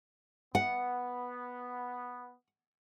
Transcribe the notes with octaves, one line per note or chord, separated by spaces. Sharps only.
B3 F#5